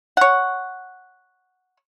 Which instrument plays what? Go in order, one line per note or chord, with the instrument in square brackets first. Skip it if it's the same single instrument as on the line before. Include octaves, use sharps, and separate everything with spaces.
[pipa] C#5 F#5